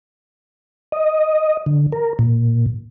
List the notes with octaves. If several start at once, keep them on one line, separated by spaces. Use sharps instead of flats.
D#5
D3
A#4
A#2